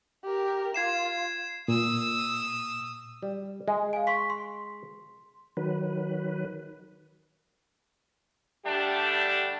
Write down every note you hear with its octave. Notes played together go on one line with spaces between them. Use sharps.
G4 A#4
F4 G#6 C7 E7
A#2 D#6 E6
G3
G#3
F5 G#5
C6 C#6 B6
C6
D#3 F#3 B4
D3 G3 A3 D4 G4